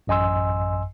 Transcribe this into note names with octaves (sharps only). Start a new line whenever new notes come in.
A1 F#2 D#5 G#5 C6 E6